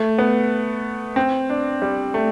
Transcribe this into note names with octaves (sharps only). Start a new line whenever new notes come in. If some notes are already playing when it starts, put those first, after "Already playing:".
Already playing: A3
B3
C4
D4
G3
A3